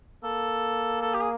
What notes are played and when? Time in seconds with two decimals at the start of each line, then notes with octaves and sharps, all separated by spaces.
0.24 A#3 A4
1.02 A4
1.14 G4
1.21 G#4